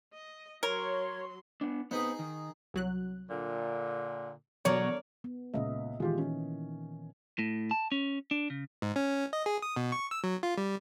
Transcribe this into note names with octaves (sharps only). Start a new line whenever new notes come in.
D#5
F#3 A#4 C#5 C6
B3 D4
B3 C4 D#4 G#4 B4
D#3
C2 F#3 F#6
A#2 D3
B2 D3 F#3 A#4 C#5 D5
B3
C#2 A#2 D#5 E5
D#3 E3 G#3 F4 G4
C#4
A2
A5
C#4
D4
C#3
G#2
C#4
D#5
G#4
D#6
B2
C#6
E6
F#3
F4
G3